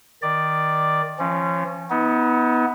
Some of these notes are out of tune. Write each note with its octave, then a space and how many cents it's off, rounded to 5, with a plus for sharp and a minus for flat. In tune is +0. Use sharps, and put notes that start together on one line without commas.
D#3 +0 D5 +5
F3 -35 C#4 -25
B3 +0 D#4 +40